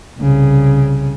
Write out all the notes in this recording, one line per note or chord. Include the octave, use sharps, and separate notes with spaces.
C2 C#3